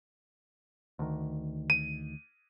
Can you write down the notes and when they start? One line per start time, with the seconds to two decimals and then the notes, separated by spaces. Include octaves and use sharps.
0.99 D2 D#3
1.70 D#7